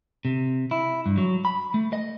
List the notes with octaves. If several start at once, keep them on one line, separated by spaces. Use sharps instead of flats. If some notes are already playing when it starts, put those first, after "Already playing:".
C3
E4
G2
F#3
B5
A3
D#5